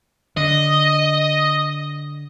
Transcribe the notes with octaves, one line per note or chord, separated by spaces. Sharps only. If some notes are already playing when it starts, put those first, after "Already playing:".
D3 D#5